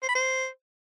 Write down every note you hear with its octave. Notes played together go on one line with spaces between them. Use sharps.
C5
B5
C5